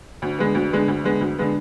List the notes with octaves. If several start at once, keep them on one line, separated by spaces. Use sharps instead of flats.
D2
D3 G#3 B3
D2
D3 G#3 B3
D2
D3 G#3 B3
D2
D3 G#3 B3